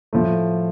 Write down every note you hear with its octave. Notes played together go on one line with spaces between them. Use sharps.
A2 F3 A3